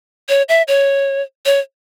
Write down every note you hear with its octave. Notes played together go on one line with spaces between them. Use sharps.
C#5
E5
C#5
C#5